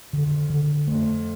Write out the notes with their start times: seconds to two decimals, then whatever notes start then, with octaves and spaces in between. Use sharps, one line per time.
0.12 F2 D3
0.50 D3
0.87 F2 A3